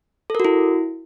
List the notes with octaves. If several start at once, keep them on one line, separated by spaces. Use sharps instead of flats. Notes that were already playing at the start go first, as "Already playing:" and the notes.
E4 F#4 A4 A#4